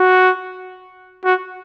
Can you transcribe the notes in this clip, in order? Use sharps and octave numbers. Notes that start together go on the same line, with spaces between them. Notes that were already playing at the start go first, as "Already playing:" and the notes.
Already playing: F#4
F#4